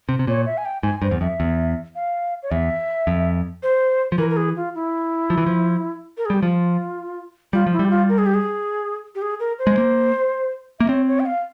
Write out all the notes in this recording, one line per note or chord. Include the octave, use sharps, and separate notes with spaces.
C3
C3
A#2 C#5
E5
G#5
G5
G#2 G#5
G2 C5
E2
F2 E5
E2
F5
C#5
E2 E5
F2
C5
F3
E3 A#4
A#4
G#4
F4
E4
F3
E3
F3
A#4
G#4
G3 G4
F3 F4
G3 F4
F3
E4
G3
G4
F4
A#4
G#4
G4
G#4
G4
G#4
A#4
C5
G#3
A#3
A#3 E5
C4 C#5
C#5
G5
F5